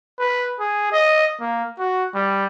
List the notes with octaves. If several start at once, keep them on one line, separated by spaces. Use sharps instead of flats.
B4
G#4
D#5
A#3
F#4
G3